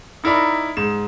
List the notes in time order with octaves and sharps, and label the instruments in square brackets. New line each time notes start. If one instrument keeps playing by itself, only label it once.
[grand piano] D#4 E4 A#4 D5 B5
G#2 E7